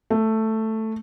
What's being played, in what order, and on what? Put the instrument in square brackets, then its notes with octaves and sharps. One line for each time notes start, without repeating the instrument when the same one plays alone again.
[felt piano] A3